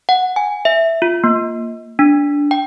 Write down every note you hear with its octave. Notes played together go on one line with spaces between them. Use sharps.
F#5
G#5
E5
F4
A#3
D4
G5